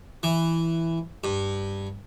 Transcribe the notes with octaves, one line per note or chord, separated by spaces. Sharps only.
E3
G2